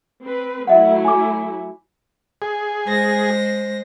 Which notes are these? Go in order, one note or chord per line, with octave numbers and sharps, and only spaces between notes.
C4 B4
F#3 A3 E4 E5 F#5
G#5 D6
G#4
G#3 C5 A#6